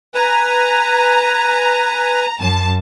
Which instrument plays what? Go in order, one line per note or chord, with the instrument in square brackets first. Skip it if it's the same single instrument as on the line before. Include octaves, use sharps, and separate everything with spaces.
[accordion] B4 G#5 [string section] A#5
[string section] F#2 A5